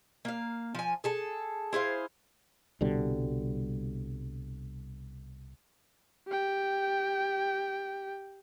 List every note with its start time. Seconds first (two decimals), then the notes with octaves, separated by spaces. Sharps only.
0.25 A#3 F5
0.75 F3 G#5
1.04 G#4 A4 A5
1.73 E4 G#4 C5 F5
2.81 C2 B2 D3 G3
6.27 G4 G5